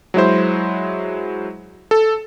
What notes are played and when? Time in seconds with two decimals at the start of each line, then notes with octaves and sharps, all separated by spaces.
0.14 F#3 G#3 E4 C5
1.91 A4